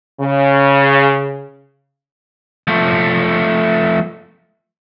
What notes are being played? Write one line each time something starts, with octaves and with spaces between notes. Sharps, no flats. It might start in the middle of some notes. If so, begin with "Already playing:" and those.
C#3
F3 A3